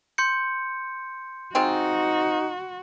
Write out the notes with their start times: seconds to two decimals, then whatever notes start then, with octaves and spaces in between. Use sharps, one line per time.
0.18 C6 G6 C#7
1.55 G#3 C4 D#4 F4 F#4